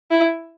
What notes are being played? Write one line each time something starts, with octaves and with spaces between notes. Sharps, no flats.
E4